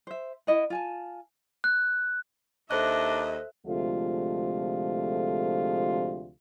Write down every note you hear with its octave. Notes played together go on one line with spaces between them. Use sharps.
C5 E5
E4 D#5 F#5
F4 G#5 A5
F#6
D#2 D4 A4 C5 D#5 E5 F#6
D2 C3 F3 G#3 A3 F4